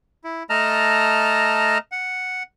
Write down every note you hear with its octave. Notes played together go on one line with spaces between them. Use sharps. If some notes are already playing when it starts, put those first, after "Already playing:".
E4
A3 D#5 A5 A#5 F6
F#5